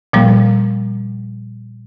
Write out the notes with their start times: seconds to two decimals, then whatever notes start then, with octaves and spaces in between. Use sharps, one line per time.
0.13 A#2 F3 G3 A#3